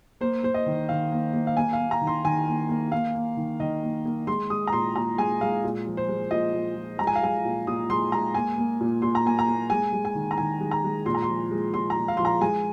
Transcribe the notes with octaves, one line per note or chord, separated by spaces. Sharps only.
A#3 C5
A#3 C5
D#5
D#3
D#3 F5
A#3
A#3
F5
A#3 G#5
F5
A#3
A#5
D#3
C6
D#3 G#5
A#3
A#3
A#3 F5
A#3
D#3
D#3 D#5
A#3
A#3
G#3 C6
G#3 D#6
A#5
A#2 C6
A#2 A#5
G#3 G#5
G#3 F5
A#2
F3
C5
G#3
A#2 D#5
A#2
F3
G#3 A#5
G#5
F5
G#3 G#5
A#2
A#2 D#6
G#3 C6
G#3 A#5
A#3 G#5
A#3
A#2
A#2 C6
A#5
A#3 G#5
A#5
A#3
G#3 G#5
G#3
G#5
D#3
A#5
D#3 G#5
G#3
A#5
G#3
A#2 C6
A#5
C6
F3
G#3
A#2 C6
A#5
A#2
F5
F3 C6
A#5
G#3 G#5